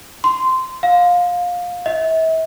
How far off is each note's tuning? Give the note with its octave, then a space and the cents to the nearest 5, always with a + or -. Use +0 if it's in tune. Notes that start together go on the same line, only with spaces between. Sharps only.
C6 -15
F5 +25
E5 -40